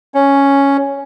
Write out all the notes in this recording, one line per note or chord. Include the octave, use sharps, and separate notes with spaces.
C#4